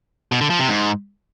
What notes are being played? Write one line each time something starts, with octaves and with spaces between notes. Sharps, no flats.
B2
D3
F3
C3
G#2